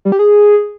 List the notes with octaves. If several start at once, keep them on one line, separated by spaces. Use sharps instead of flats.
G3
G4
G#4